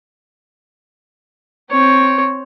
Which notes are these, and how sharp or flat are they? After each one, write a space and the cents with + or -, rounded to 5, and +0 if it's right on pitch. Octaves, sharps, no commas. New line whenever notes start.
C4 +5 C#5 +0